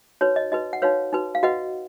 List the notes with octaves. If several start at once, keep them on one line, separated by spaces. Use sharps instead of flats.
D#4 F#4 B4 C#5
D#5
D#4 F#4 B4 D#5
F#5
D#4 F#4 B4 C#5 F5
D#4 F#4 B4
F5
F#4 B4 D#5 F#5